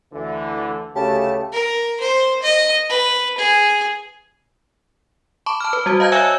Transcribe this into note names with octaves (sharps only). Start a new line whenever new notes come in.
D2 D3 E3
D2 C#3 A3 G4 G#4 A5
A#4
C5
D#5
B4
G#4
A5 B5 C#6 D6
A5 F6
B4
G3 F#4 C5
D#5 F5 A5 G6 G#6
C#5 E5 F5 G#5 E6